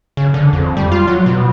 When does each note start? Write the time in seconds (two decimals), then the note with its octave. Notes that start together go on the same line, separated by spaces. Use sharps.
0.17 C#3
0.34 D3
0.53 F2
0.77 G3
0.92 F4
1.07 F#3
1.26 B2